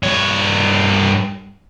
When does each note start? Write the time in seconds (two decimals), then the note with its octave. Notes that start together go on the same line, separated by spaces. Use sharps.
0.03 G2 C#5